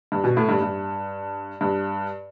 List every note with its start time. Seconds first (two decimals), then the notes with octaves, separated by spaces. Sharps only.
0.12 G2
0.24 B2
0.37 A2
0.49 G2
0.61 G2
1.61 G2